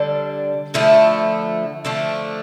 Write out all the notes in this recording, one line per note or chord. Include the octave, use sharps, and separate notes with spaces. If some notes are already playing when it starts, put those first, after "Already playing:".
Already playing: D3 G3 D4 A4
D3 F3 A3 E4
D3 F3 A3 D4